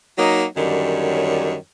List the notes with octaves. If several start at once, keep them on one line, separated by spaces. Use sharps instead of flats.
F#3 A#3 D#4
F#2 D3 D#3 G3 C#5